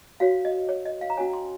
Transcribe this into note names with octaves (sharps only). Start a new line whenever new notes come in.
F#4 C#5 F5
D#5
C#5
D#5
F5
A#5
C#4 F#4 C#5 G#5
C6